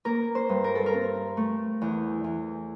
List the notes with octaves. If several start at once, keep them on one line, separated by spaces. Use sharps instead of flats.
A#3 A#4
C5
G2
A#4
A4
A#4
C4
A3
E2
E2